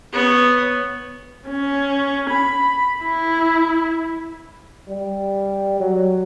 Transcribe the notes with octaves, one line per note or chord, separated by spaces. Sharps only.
B3 C#5
C#4
B5
E4
G3
F#3